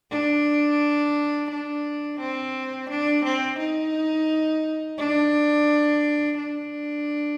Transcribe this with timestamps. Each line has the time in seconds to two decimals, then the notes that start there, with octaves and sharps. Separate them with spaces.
0.11 D4
1.50 D4
2.20 C4
2.90 D4
3.25 C4
3.59 D#4
4.98 D4
6.37 D4